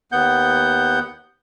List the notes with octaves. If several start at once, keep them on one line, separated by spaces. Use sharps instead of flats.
D#2 B3 F#5 G6